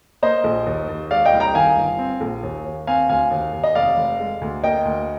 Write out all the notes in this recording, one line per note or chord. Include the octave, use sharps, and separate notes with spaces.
A#3 C5 D#5
A#1
D#2
D#2
G#3 D5 F5
D#5 G5
C2
G5 A#5
D#3 F5 G#5
G1
C4
A#1
D#2
D#2
C4 F5 G#5
D2 F5 G#5
D#2
D#2
D#5
F1 D5 F5
F1
G#3
D2
A#3 D#5 G5
D2